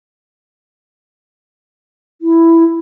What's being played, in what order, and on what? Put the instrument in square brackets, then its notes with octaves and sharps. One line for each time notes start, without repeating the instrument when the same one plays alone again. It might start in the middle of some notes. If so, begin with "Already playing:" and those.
[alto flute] E4